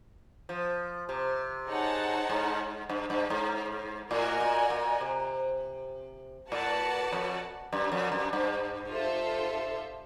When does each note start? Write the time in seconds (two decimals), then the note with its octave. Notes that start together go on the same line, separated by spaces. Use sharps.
0.49 F3
1.09 C3
1.69 D#4 G#4 C#5 F#5 A5
2.29 G#2
2.89 G2
3.10 G2
3.30 G#2
4.10 A2 F#4 A#4 D#5 G#5
4.40 A#2
4.70 A#2
5.01 C3
6.51 A2 F#4 B4 D5 F#5 A5
7.12 F2
7.72 F#2
7.92 F2
8.12 F#2
8.33 G2
8.92 F4 A4 C5 E5